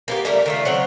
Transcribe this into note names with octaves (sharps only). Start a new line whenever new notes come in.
A#3 B3 G4
G3 A3 F4 A#4
D#3 A3 F4
F#3 C4 C#5 F#5